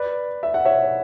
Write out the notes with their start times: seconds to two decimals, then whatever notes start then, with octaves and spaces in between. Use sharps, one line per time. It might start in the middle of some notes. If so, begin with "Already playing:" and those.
Already playing: B4 D5
0.43 E5
0.54 F#5
0.65 C#5 E5